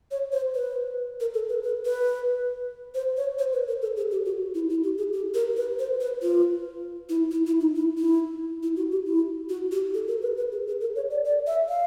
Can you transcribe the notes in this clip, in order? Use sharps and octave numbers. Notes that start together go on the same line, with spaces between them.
C#5
C5
B4
A#4
A4
B4
B4
B4
C5
C#5
C5
B4
A#4
A4
G#4
G4
F#4
E4
E4
G4
G#4
G4
A#4
B4
C5
B4
F4
E4
E4
E4
D#4
E4
E4
E4
F#4
G4
E4
F#4
G4
A4
A#4
B4
B4
G#4
G#4
A#4
C#5
D5
D5
E5
F5